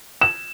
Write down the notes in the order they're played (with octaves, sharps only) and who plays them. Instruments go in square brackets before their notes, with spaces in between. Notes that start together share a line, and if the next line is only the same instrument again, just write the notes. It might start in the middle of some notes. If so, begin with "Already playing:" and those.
[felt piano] E7